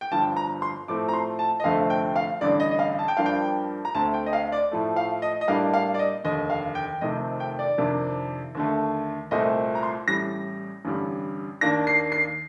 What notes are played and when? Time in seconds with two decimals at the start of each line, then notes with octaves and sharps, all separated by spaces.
0.01 G5
0.11 G1 G2 F3 A5
0.37 A#5
0.62 C6
0.88 A2 F3 A3 C4 D6
1.09 A#5
1.13 C6
1.39 A5
1.60 D#5
1.64 F1 F2 D3 A3 C4 F5
1.90 G5
2.16 F5
2.41 A1 G2 D3 D5
2.60 D#5
2.71 D#5
2.79 F5
2.99 A5
3.08 G5
3.17 G2 F3 A#3 D4 F5
3.26 G5
3.85 A#5
3.95 D2 D3 A3 C4 A5
4.14 G5
4.26 D#5
4.33 F5
4.52 D5
4.71 A2 F3 A3
4.96 F5
5.22 D#5
5.41 D#5
5.48 A2 G3 A#3 D4 F5
5.74 F5
5.94 D5
5.99 D#5
6.24 F1 D#2 D3 D#5
6.50 F5
6.75 G5
7.01 F1 F2 C3 D#3 A3 D#5
7.40 G5
7.59 D5
7.78 F2 C3 D#3 A#3 D4
8.55 D#2 D3 A3
9.31 C2 A#2 A3 C4 D#5
9.75 A#5
9.83 C6
10.08 A1 A2 G3 A#6
10.85 A1 G2 D3 G3
11.61 D#2 D#3 A#3 D4 A#6
11.87 C7
12.12 C7